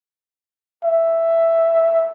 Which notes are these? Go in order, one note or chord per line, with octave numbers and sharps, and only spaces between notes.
E5